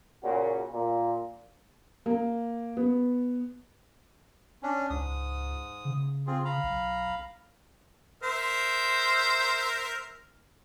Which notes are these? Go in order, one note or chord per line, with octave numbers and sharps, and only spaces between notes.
A#2 C#3 F#4
A#2
A#3
B3
C#4 D4
C#2 G#2 D#6
C#3
C4 F4 G#4
F5 A#5 B5
B1
A#4 C5 E5